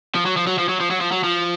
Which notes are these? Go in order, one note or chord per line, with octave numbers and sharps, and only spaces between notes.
F3
F#3
F3
F#3
F3
F#3
F3
F#3
F3
F#3
F3